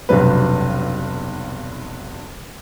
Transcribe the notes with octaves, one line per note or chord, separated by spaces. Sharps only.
F1 B1 G2 F#3 B4